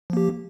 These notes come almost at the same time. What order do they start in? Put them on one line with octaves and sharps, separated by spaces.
F3 A#3 G4